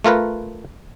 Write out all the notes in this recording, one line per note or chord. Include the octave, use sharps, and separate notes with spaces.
A3 F4 A#4 B4